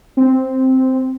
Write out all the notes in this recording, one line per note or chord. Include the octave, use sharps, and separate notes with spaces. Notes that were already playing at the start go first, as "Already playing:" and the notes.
C4